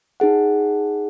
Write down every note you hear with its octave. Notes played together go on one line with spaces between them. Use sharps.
D#4 G#4 F#5